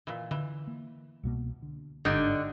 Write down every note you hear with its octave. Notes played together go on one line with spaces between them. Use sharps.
A#2 E3
D3 E3
A#3
C2 B2 A#3
D3
G1 G#2 D3 D#4 G4 D5